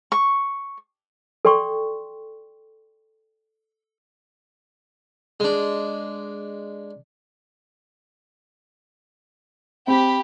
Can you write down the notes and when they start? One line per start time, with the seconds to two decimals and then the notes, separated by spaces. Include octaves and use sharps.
0.12 C#6
1.45 A4 D5 G5 C6 C#6
5.40 G#3 D4
9.87 C4 G4 B5